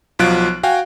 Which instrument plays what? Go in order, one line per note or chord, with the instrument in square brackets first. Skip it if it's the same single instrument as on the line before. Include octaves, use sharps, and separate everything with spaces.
[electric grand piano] B1 F3 F#3 F4 F#6 D7
F#4 F5 G5 G#5